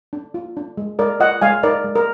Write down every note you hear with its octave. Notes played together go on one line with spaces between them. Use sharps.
D4
F4
D4
G#3
G#3 A#4 D5
F4 D#5 F#5
G#3 F5 G#5
D#4 A#4 D5
G#3
A#4